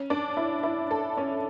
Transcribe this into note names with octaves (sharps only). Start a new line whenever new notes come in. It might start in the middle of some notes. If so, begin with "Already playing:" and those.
Already playing: C#4
D4
E4
E4
A4
C#4